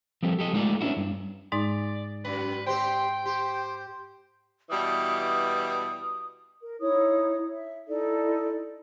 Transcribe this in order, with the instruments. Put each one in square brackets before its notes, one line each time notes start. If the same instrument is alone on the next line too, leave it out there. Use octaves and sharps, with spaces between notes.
[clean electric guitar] F3 G3 C4 G4 A4
G4 A4 D#5
G#3 A3 D#4 F4 C5 D5
B3 C#4 D4 E4 F#4
G2
[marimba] G#2 G#3 D#4 [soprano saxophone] D5
[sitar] F#2 [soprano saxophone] B4
[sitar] C4 G4 C5 [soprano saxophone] G5 [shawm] C6
[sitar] G4 [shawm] C5
[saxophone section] B2 E3 G3 [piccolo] D#6
[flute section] A#4
D#4 E4 C#5 D#6
E5
D#4 E4 A4 D5